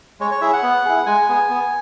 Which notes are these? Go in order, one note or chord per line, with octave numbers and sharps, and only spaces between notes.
G#3 C#5
C#5
E4 G#4 E5
F#5
B3
E4 G#4
G#3 G#5
B3 G#4
B3